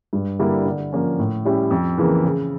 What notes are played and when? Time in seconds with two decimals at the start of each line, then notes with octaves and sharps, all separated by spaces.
0.13 G2
0.39 D3 G3 A#3 E4
0.66 D3
0.93 F3 A#3 C#4
1.19 A2
1.45 G3 C#4 E4 G4
1.71 F2
1.98 C#3 E3 A#3
2.24 C#3